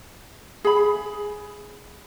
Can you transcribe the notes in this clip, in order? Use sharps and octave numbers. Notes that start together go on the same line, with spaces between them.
G#4 B5